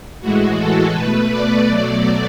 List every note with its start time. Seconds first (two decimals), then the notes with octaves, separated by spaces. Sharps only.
0.21 A2 E3 G#3 F#4
0.58 A4
0.94 B2 A3 B4
1.30 D5
1.67 B2 F#3 A3 D5